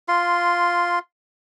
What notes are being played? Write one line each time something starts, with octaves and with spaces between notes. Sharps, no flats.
F4 C6